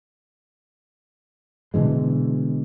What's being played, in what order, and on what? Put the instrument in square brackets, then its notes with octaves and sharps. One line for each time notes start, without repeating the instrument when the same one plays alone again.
[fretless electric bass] B2 D3 E3 G#3